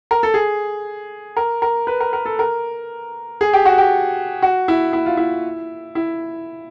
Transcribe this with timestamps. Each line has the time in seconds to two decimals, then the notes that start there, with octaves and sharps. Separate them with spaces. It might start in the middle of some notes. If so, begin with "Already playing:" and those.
0.11 A#4
0.23 A4
0.34 G#4
1.37 A#4
1.62 A#4
1.87 B4
2.00 A#4
2.13 A#4
2.25 A4
2.39 A#4
3.41 G#4
3.53 G4
3.65 F#4
3.78 G4
4.42 F#4
4.68 E4
4.93 E4
5.06 F4
5.17 E4
5.95 E4